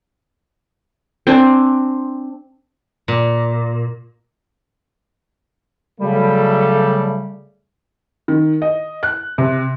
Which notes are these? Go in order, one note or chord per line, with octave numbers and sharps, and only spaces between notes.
C4 D4 C5 G#5
A#2
C#3 F#3 G3 A3 A4
D#3
D#5
F#6
C3